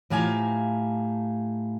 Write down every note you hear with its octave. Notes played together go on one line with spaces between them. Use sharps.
A2 F3 G4 F5 G#5 A#5